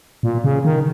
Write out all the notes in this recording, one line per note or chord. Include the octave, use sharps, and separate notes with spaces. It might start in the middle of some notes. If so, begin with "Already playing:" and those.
A#2
C#3
D#3